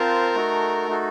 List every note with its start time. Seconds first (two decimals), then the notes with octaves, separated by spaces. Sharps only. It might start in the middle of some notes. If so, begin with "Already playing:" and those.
Already playing: C4 F4 A#4 C5 F5 A5
0.35 A3 D#4 F#4 A4
0.88 A3 D#4 F#4 A4